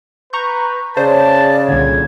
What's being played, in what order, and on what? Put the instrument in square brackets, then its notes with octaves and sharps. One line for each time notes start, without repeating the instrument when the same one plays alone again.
[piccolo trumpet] B4 [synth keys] A#5 C#6 G6
[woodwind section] C#3 [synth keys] C5 [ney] D5 [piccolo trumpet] A5
[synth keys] C2 A#2 D3 [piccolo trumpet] G#6